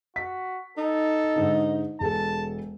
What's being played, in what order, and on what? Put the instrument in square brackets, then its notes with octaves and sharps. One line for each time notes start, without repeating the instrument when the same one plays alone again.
[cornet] F#4 [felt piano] B6
[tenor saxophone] D#4 [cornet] A4
[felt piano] G#2 D3
[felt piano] E1 G#4 A4 [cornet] A5